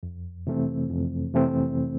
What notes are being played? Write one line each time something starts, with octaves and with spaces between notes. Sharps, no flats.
F2
C3 E3 A3 C4
F2
C3 E3 A3 C4